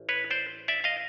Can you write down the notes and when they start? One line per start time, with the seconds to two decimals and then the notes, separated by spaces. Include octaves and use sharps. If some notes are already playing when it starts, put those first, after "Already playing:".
Already playing: A1
0.09 B4 C#5
0.30 C5 D5
0.68 D5 E5
0.84 D#5 F5